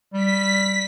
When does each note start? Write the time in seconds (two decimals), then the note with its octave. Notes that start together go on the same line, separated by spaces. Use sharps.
0.14 G3 B6